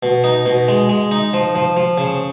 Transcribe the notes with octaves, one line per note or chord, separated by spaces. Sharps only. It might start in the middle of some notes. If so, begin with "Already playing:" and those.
B2
D#4
B2
G#3
G#3
D#4
F3
F3
F3
C#3